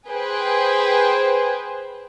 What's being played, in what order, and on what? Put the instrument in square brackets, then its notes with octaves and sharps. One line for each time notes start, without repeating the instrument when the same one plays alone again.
[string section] G#4 B4 C5 G5